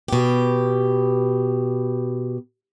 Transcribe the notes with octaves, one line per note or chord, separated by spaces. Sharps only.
B2 G4